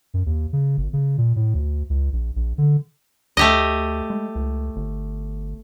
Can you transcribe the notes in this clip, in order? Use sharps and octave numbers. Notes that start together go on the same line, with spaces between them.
F#2
D#2
C#3
G1
C#3
A#2
A2
D2
C#2
A#1
A#1
D3
D2 A3 G4 D#5
G#3
C#2
G1